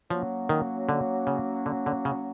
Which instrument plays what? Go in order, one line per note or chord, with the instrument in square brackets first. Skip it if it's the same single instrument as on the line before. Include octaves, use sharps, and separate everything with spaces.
[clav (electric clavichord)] F3 [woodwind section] F#3 A#3 C#4
[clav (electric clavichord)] D#3
D3
C#3
D3
D3
C#3